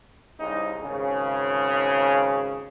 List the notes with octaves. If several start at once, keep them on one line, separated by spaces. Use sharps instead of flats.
C2 C#3 D#4
G#1 C#3